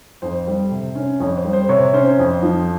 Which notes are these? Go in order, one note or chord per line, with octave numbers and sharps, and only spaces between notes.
F2 C5
G3
C3
C#4
F2 C#5
C5
G3
C5
C3 C#5
C#4 C5
F2
F3